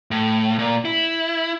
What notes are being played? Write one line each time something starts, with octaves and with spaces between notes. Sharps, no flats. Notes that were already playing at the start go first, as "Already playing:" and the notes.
A2
A#2
E4